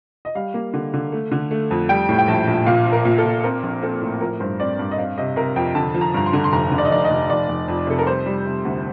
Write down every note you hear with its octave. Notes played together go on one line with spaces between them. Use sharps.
D#5
G3 F5
A#3
D3
D3
A3
D3
A3
F2
G3 G5
A2
G5
A#1 A5
A#1
A#2 F5
F3
A#4
A#2
A4
A#2
C4 A#4
A#1
C4 A4
A2
F3 A#4
G2 C5
C4 D5
G2
D#5
C4 F5
C3 D#5
C3 A#4
F2 G5
D3 A5
F3
A#5
G2 A#5
C6
D3
C6
F1 A#5
D3
D5
D#5
F1 D5
D#5
F1
F1 D5
F1
F2
C3 A4
A#4
G3 C5
G3
C3
D2